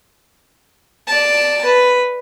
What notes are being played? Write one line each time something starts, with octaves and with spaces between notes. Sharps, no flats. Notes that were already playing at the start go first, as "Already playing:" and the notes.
D5 A5
B4